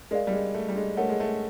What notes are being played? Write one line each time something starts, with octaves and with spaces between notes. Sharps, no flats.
G#3 A#4 D5 F5
G3
G#3
A3
G3
G#3
A3 A#4 C#5 F#5
G#3
A3